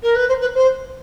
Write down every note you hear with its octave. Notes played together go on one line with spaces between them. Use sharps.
A#4
B4
C5
B4
C5